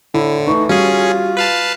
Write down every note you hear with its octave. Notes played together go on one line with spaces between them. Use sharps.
A2 D3 E4
E3 A3 D#4 C#6
G3 C#4 F4 F#4 G#4
B4 F5 A5